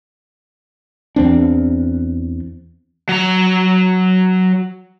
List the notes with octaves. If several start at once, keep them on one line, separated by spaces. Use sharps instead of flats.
E2 C4 D4
F#3 A#5